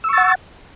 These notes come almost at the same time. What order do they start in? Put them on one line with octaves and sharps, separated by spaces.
E6 C#6 A6 F#5